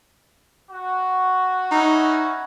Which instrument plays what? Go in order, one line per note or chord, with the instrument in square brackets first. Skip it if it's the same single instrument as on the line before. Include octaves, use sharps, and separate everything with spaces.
[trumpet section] F#4
[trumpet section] C#4 E4 F#4 [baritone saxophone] D#4